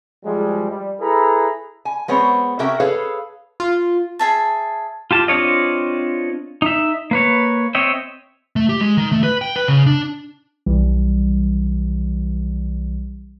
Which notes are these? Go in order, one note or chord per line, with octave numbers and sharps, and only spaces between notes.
F#2 F3 G3 G#3
G3
E4 G#4 A4 B4 A#5 B5
G#5
G#3 B3 C4 C#5
C3 C#4 F#4 A#4 E5 G5
G#4 A4 B4 C#5 F5
F4
G#4 E5 A5
F4 G4 A5
C4 D4 F4 C#5 D#5
D#4 E5
A#3 B4 C#5
C4 C#5 D#5 E5 G5
A3
G4
G#3
D#3
A3
B4
G5
B4
C#3
D4
B1 E3 G3